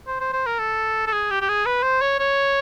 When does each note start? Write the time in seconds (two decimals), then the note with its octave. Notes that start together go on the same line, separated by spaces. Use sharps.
0.07 C5
0.20 C5
0.33 C5
0.46 A#4
0.59 A4
1.07 A4
1.13 G#4
1.30 G4
1.42 G4
1.49 G#4
1.66 B4
1.83 C5
2.02 C#5
2.19 C#5